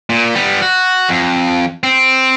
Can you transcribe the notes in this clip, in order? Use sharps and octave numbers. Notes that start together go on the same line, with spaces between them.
A#2
G3 B3
F#4
F2
C4